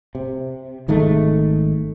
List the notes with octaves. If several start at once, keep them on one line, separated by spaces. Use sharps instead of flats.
C3
G#1 D#3 G#3 A3